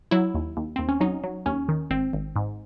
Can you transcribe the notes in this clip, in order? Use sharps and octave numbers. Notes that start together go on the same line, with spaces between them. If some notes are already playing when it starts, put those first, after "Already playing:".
F#3 E4
D#2
D#2
D#2 C4
C#4
F#3 D#4
F#3
D#2 C#4
D#3
G#1 C4
G#1
G#2